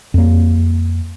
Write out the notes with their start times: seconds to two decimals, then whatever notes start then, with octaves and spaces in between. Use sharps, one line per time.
0.14 F2 A#3